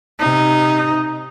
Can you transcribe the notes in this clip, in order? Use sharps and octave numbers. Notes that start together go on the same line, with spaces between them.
C3 D#4